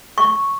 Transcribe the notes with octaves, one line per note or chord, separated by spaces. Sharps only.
C#6